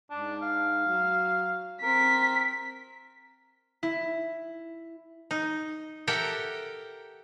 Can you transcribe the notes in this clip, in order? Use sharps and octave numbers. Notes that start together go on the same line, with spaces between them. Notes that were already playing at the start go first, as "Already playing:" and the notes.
G#2 D4
F5
F#3
C4 A#4 B6
E4
D#4
G4 A4 A#4 E5 F#5 G5